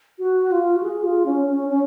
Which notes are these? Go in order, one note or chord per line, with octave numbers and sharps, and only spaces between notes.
F#4
F4
F#4
G#4
F4
C#4
C#4
C#4